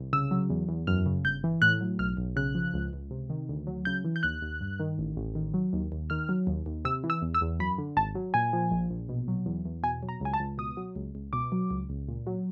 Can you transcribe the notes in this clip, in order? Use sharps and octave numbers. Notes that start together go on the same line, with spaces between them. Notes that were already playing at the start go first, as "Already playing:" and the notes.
Already playing: C2
C#3 E6
F#3
E2
E2
F#2 F6
C#3
G1 G6
E3
A2 F#6
F#3
B1 F6
B1
C#3 F#6
F3
C#2
C#2
C3
D#3
D2
F#3
C#3 G6
E3
G6
D#2 F#6
D#2
G2
D#3
A1
A1
D#3
F#3
D#2
D#2
D#3 F6
F#3
D#2
D#2
C3 E6
E3
E6
E2
E6
E2
F#2 B5
D3
G#1 A5
F#3
A#2 G#5
F3
A#1
A#1
B2
F#3
E2
E2
B2 G#5
F#3
A#5
C#2 G#5
A5
C#2
B2 D#6
F#3
C#2
C#2
B2 D6
F#3
C#2
C#2
A#2
F#3